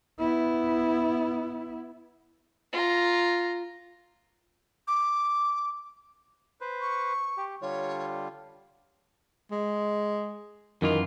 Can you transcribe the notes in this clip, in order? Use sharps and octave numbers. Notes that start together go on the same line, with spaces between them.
B3 E4
F4 A#5
D6
B4 C5
C#6
G4
D3 G3 F4 C#5
G#3
F#2 D#3 E3 F4